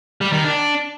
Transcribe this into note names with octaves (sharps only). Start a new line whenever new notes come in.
G3
D#3
D4